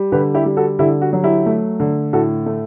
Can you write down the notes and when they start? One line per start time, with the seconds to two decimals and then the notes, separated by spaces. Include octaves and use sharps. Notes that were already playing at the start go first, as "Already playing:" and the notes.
Already playing: G3
0.12 D3 G4 B4
0.34 E4 G4
0.46 G3
0.57 F#4 A4
0.79 D3 E4 G4
1.01 F#4
1.13 F#3
1.24 E4 G4
1.46 A3
1.80 D3
2.13 A2 F#4 A4
2.46 A3